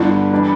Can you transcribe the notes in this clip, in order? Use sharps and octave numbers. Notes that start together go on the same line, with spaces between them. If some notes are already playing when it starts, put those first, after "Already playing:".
Already playing: G1 G2 D3 E4
E3 G3 D4